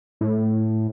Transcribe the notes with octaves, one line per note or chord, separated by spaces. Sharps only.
A2